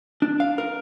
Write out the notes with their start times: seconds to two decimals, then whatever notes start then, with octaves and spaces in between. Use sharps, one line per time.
0.22 D4
0.40 F5
0.58 A#4